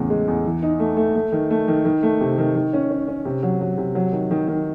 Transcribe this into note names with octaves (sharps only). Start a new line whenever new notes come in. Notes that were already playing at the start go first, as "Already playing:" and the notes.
Already playing: E2 A2 C#3
G#3
E2
E3
D#4
A3
A3
A3
D#3
A3
D#3
D#3
A3
C3
D#3
D#3
C#4
C#4
C#4
C3
F#3
F#3
C3
F#3
D#3
D#3
D#3